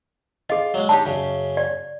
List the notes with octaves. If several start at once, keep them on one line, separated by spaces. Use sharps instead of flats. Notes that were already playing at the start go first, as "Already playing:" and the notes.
F4 G#4 D#5
F#3 G#3
D4 D#4 G4 A5
F#2 C#3
D5